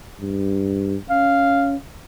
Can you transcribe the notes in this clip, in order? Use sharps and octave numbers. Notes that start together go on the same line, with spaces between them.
G2
C#4 F5